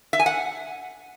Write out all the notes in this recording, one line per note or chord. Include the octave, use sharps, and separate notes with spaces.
E5
G#5
F#5